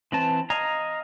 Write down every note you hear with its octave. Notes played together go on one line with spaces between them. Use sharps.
E3 C4 A5
D#5 F5 G#5 A#5